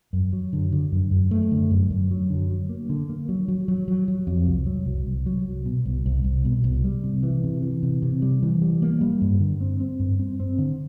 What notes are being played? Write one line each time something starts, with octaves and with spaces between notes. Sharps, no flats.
F#2
F#3
D3
D3
F#2
F#2
A3
D3
F#2
F#2
F#3
D3
F#3
A#3
D3
A#3
F#3
F#3
F#3
F#3
F#3
F2
C2
F#3
C2
C2
F#3
C2
B2
C2
C2
C2
B2
C2
G3
C3
E3
C3
E3
C3
C3
G3
E3
G3
A#3
G3
G2
D3
C4
C4
G2
C4
C4
D3